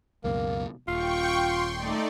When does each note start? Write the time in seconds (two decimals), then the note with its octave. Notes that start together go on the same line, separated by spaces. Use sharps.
0.24 C#2 F#2 B2 A#3
0.88 D#1 F4 G5 C#6
1.34 C6
1.77 A3 D#4 D5